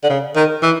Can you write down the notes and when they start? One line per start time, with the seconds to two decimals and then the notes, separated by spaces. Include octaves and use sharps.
0.03 D3
0.10 C#3
0.36 D#3
0.63 E3